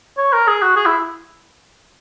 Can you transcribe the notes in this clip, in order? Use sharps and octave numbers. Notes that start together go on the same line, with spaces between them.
C#5
A#4
G#4
F#4
G#4
E4